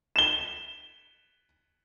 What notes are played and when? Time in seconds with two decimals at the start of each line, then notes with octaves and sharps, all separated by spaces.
0.16 E7 G7